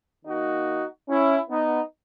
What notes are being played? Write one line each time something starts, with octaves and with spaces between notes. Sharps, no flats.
D#3 A#3 D#4 F#4
C#4 E4
B3 D#4